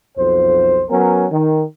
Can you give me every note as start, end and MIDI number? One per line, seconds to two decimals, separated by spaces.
0.18 0.84 35
0.18 0.84 41
0.18 0.84 72
0.90 1.25 54
0.90 1.25 59
0.90 1.25 61
0.90 1.25 70
1.31 1.63 51